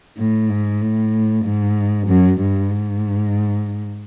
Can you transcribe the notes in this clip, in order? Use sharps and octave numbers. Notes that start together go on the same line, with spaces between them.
A2
G#2
A2
G#2
F#2
G2
G#2